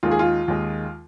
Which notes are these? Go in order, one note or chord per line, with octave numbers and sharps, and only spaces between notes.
D#2 D#3 G#3 F4
G#4
F4
D#2 D#3 G#3